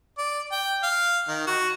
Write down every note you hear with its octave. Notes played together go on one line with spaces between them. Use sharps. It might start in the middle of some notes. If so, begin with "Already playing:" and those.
D5
G5
F5
D#3
F#4